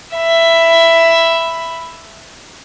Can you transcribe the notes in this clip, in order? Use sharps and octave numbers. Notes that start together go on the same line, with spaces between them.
E5 B5